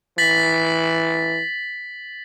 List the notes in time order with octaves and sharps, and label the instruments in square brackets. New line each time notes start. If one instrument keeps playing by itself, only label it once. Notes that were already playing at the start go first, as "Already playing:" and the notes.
[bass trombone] E3 [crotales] A6 B6 F#7